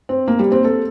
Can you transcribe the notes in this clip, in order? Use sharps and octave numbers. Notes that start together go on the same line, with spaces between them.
C4
A#3
G3
C4
A4